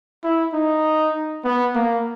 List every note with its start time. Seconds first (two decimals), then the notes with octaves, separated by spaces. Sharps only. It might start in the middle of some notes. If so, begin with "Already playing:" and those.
0.24 E4
0.54 D#4
1.45 B3
1.75 A#3